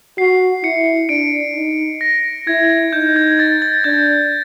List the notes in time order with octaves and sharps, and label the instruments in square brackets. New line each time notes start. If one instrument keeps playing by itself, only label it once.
[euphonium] F#4 [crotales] C7
[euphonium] E4 [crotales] C#7
[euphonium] D4 [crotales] D7
[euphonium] D#4
[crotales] A#6
[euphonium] E4 [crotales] G#6
[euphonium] D#4 [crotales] G6
[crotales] G#6
A6
A6
[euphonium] D4 [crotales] G6